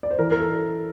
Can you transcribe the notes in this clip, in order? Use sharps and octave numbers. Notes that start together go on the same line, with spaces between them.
D5
C5
E3 A#4
A#4
A4